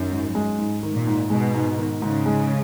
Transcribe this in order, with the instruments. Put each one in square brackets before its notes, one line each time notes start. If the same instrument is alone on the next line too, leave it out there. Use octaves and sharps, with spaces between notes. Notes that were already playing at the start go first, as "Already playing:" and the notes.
Already playing: [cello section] F#2 [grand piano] D#3
[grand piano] G#2
G#3
G#2
D#3
[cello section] A#2
[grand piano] G#2
[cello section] B2 [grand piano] G#3
[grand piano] G#2
D#3
[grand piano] G#2 [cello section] C#3
[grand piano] G#3